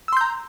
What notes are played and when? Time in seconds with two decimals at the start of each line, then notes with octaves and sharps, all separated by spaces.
0.08 E6
0.12 C6
0.17 G6
0.21 A#5